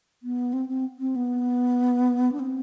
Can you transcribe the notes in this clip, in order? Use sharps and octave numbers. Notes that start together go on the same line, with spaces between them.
B3
C4
C4
C4
B3
D4
C4